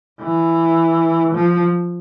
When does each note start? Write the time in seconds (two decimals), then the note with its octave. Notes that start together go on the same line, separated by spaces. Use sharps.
0.21 E3
1.34 F3